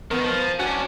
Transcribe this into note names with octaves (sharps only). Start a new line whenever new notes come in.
D#3 B3 A#4
F3
D#7
C#4 D4 F#4